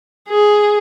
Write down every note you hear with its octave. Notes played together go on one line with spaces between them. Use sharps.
G#4